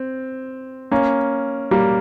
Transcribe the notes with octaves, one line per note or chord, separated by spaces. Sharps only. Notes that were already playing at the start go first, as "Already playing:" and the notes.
Already playing: C4
A#3 C#4
G3 A#3